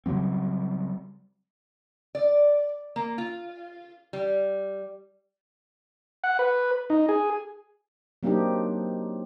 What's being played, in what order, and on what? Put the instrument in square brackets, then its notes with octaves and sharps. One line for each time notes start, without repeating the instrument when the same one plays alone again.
[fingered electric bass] C#3 F#3 G3 C4
[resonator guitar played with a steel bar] D5
A#3
F4
G3
[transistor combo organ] F#5
B4
D#4
G#4
[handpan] F#3 A#3 C4 D4 D#4 G4